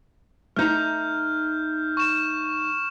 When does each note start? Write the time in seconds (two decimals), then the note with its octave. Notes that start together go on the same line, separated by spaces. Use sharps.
0.56 A3 D#4 A#5 F6 G6
1.97 C#6 E7